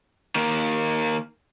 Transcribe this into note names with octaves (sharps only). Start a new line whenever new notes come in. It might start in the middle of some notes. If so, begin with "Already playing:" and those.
D#3 A#3